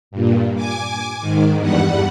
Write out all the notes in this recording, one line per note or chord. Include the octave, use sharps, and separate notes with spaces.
G2 A#2
G#5 D6
G#2 D#3
E2 G2 G3 F#5